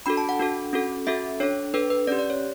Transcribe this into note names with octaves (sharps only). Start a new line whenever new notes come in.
D4 F#4 A4 B5
A5
F#5
D4 F#4 A4
C#4 F#4 A4
C#4 F#4 A4 E5
D4 A4 C#5
D4 A4 B4
B4
C#4 G4 D5
D5
C#5